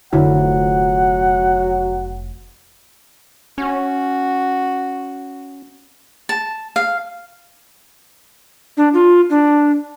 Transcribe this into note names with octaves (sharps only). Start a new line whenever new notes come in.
F1 D3 F#3 E4 F#5
C#4 F#4
A5
F5
D4
F4
D4